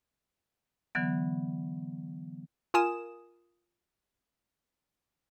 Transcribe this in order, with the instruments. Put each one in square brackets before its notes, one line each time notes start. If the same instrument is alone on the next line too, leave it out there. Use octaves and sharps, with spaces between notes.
[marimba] D3 E3 F#3 B3
[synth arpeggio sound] F4 A#4 G#5 D#6 E7